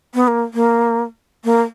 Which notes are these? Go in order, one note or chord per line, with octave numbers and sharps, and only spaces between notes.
B3
A#3
A#3
A#3